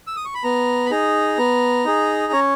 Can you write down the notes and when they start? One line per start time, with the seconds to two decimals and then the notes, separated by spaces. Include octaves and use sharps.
0.07 E6
0.16 D#6
0.25 C#6
0.34 B5
0.43 B3 A#5
0.86 B5
0.91 D#4 G#4 A#5
1.38 B3
1.85 D#4 G#4
2.33 C#4 C#5